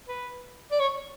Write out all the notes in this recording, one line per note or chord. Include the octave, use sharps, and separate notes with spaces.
B4
D5
C#5